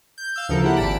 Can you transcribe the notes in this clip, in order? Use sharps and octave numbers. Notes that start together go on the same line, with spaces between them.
G6
F5 E6 G6
D2 C#3 F3 A4 A#4 G6
A#3 E4 G4 F#5
G#1 A#2 A5 B5 D7